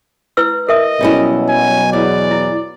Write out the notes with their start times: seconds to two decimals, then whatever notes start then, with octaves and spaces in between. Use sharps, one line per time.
0.37 E4 B4 E6
0.69 A#4 D#5 E5 D#6
1.01 B2 F#3 G3 C#4 E4
1.49 G#5
1.93 E2 D5
2.31 E4